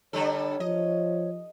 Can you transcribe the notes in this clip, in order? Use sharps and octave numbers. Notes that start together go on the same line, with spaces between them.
D3 G3 A4 C#5
F3 D#5